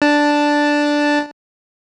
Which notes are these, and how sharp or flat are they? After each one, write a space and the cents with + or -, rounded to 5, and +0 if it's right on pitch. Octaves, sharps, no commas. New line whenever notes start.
D4 +0 A5 +0